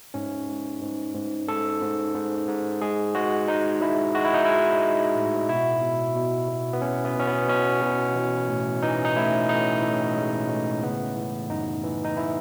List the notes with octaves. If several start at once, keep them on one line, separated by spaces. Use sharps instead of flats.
G#2 C#4
G#2
G#2
G#2
G#2 A4
G#2
G#2
G#2
G#3 G#4
G#3 F#4
G#3 D#4
G#3 E4
G#3 F#4
E4
D#4
G#3 E4
G#3
A2
B2 E4
B2
B2
B2
B3
B2 C#4
B3
B2 C#4
B3
B2 C#4
B2
E3
A2
E3 D#4
D#4
A2 E4
A2 D#4
A2
G#3
A2
C#3 B3
E3
F#2 D#4
E3
D#4
E3 E4